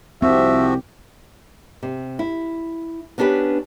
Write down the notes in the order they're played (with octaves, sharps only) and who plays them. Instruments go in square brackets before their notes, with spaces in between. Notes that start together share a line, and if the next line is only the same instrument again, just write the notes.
[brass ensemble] C2 G4 [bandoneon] F3 F#4 [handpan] C4 [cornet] E5
[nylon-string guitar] C3
E4
B3 C#4 D4 G4 B4